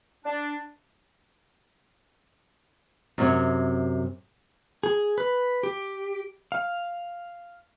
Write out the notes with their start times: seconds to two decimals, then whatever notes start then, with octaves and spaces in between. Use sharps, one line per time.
0.25 D4
3.18 F#2 C3 C#5
4.83 G#4
5.18 B4
5.63 G4
6.52 F5